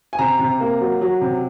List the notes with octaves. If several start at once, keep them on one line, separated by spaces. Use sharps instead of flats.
G#5
C3 A#5
C3
A#3
F#3
F#3
C3